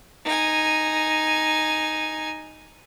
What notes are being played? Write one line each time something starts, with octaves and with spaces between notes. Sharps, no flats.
D#4 G#5